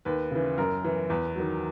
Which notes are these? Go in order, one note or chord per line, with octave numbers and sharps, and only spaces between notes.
D#2 B4
C#3 E3
F#2 A#4
E3
E2 B4
D#3 F#3